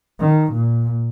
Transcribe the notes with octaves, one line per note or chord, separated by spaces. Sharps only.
D#3
A#2